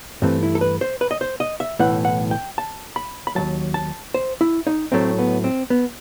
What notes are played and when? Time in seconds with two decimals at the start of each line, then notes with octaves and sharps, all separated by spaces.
0.22 G2 E3 A3 C4
0.43 E4
0.55 A4
0.61 B4
0.81 C5
1.01 B4
1.11 D#5
1.21 C5
1.40 D#5
1.60 E5
1.79 B1 A2 E3 F#5
2.05 F#5
2.31 G5
2.58 A5
2.96 B5
3.27 B5
3.35 D#2 D#3 F#3 A5
3.74 A5
4.14 C5
4.41 E4
4.67 D#4
4.92 A2 F#3 A3 C4
5.19 B3
5.44 C4
5.70 B3